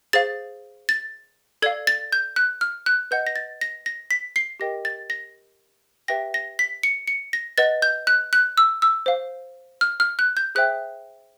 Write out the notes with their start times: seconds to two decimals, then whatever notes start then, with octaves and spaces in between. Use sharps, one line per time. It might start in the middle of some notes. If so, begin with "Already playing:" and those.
0.13 G#4 C5 F5 A6
0.89 A6
1.62 A4 D5 F5 G#6
1.87 A6
2.12 G6
2.36 F#6
2.61 F6
2.86 F#6
3.11 B4 D#5 F#5 G6
3.27 A#6
3.36 A6
3.61 A#6
3.86 A#6
4.11 B6
4.36 C7
4.60 G4 A#4 D#5 G5 A#6
4.85 A6
5.10 A#6
6.08 G4 B4 E5 G5 A#6
6.34 A#6
6.59 B6
6.83 C#7
7.08 C#7
7.33 A#6
7.58 B4 D#5 F#5 A6
7.82 G6
8.07 F#6
8.33 F#6
8.57 E6
8.82 E6
9.06 C5 F5
9.81 F6
10.00 F6
10.19 F#6
10.37 G6
10.55 G#4 C5 E5 G5 F#6